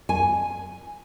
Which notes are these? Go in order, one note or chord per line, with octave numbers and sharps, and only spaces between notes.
G#5